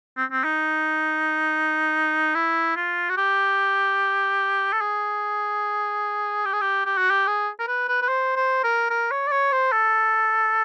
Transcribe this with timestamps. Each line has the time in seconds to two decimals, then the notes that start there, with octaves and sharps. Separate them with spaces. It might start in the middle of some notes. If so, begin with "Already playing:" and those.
0.17 C4
0.32 C4
0.44 D#4
2.35 E4
2.76 F4
3.09 F#4
3.17 G4
4.73 A4
4.81 G#4
6.45 G4
6.53 G#4
6.61 G4
6.86 G4
6.97 F#4
7.10 G4
7.27 G#4
7.59 A#4
7.68 B4
7.88 B4
8.02 B4
8.08 C5
8.36 C5
8.64 A#4
8.90 A#4
9.11 C#5
9.27 D5
9.31 C#5
9.52 C5
9.72 A4